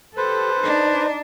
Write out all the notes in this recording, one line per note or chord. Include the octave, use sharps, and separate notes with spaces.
G4 A4 B4 C5
D4 D#4